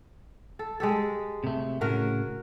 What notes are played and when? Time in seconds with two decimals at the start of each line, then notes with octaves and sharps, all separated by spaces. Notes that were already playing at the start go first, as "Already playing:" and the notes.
0.59 A4
0.80 G#3 G4 A4
1.44 C3 A3
1.81 A2 C#3 F#4 A#4